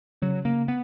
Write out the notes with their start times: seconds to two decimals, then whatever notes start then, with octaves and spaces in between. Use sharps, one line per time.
0.22 C#3 F#3
0.45 C#3 A#3
0.68 B3